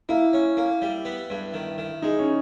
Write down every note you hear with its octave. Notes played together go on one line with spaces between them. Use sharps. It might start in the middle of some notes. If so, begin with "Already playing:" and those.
A#3 E4
C#4
A#3
G3
B3
G2
D#3
D#3
G#3 D#4
C#4